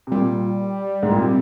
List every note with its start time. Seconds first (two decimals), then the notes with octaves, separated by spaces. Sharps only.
0.07 C3
0.12 A#2 G3
1.03 G#2
1.11 A#2
1.19 C3